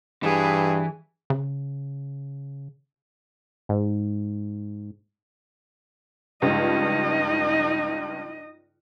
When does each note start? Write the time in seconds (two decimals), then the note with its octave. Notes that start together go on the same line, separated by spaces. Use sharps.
0.23 G2 E3 G#4
1.30 C#3
3.69 G#2
6.42 C#2 G2 F3 D#4 D#5